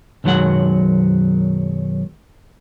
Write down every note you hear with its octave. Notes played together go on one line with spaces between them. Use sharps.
B1 F#2 D#3 F#3 G#3 F#5